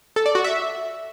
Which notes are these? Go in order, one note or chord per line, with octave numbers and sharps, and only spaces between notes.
A4
D5
F#4
E5